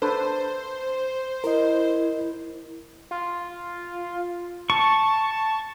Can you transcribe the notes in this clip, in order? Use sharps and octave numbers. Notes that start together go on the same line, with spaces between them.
D4 A4 B4 C5
E4 A#4 D#5
F4
A5 C#6